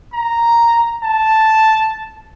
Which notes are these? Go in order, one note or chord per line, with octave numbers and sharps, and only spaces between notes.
A#5
A5